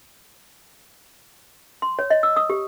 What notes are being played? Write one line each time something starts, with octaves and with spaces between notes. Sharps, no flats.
C6
C#5
D#5
E6
D#6
G4